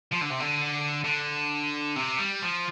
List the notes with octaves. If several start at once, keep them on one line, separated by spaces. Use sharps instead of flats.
F3
D3
C3
D3
D3
C3
G3
F3